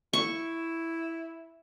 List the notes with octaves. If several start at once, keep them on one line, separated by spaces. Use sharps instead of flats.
E4 C#6